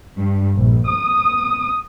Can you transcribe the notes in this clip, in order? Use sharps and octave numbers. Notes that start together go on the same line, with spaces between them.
G2
A#1
D#6